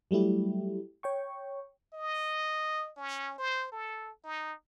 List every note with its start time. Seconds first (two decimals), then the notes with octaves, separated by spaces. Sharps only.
0.11 F#3 G3 A3 E4 G4
1.03 C#5 G5 C#6
1.94 D#5
2.97 C#4
3.38 C5
3.72 A4
4.24 D#4